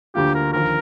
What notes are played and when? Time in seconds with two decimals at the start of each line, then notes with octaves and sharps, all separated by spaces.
0.15 D2 D3 G3 A#3 F4 G4
0.35 A#4
0.53 D#2 D3 F3 A#4